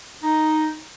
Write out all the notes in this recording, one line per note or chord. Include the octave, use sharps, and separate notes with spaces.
D#4